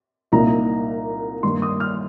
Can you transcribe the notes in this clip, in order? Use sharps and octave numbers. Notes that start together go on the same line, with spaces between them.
C2 A#2 A#3 D#4 A#5
G2 D#3 G3 A#3 C6
D#6
F6